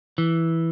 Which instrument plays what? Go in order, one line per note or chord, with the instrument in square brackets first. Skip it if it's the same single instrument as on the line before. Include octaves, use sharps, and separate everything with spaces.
[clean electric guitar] E3